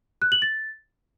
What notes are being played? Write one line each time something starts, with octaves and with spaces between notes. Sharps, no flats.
F#6
F#7
A6